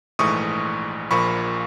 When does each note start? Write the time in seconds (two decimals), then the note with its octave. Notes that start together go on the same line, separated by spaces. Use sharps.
0.19 A#1 G#2 E3 A3 C#6 D#6
1.10 A#1 A#2 F3 A#3 B5 C#6